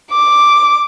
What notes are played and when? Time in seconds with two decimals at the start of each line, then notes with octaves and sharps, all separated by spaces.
0.11 D6